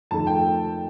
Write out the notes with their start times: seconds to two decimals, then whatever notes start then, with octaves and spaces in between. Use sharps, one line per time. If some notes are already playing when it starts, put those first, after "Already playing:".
0.11 F2 D#3 A3 A5
0.27 G5